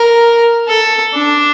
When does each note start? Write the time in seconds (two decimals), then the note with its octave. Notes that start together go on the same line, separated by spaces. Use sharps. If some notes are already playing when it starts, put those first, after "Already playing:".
Already playing: A#4
0.68 A4
1.14 D4